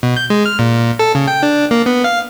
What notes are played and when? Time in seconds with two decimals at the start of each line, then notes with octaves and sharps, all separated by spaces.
0.03 B2
0.17 G6
0.30 G#3
0.46 F6
0.59 A#2
0.99 A4
1.15 C#3
1.28 G5
1.43 D4
1.71 A#3
1.86 B3
2.04 F5